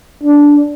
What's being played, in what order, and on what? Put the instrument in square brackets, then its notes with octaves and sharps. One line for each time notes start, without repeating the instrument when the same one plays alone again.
[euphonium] D4